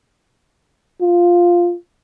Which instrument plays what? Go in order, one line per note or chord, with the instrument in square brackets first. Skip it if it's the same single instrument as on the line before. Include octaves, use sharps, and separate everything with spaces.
[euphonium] F4